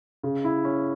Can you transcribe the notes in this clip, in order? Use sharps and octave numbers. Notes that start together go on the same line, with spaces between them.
C#3
E4
C#4